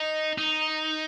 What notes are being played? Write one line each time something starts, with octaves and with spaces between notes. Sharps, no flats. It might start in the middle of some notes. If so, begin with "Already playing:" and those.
Already playing: D#4
D#4